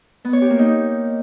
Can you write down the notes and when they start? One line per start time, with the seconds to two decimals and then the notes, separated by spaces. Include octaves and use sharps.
0.25 B3
0.33 C#5
0.42 G4
0.50 A#3
0.59 D#4